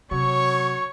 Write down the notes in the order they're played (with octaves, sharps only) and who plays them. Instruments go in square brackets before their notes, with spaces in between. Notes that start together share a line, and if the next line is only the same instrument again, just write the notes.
[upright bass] C3 [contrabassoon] F#3 [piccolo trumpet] C#5 [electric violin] C#6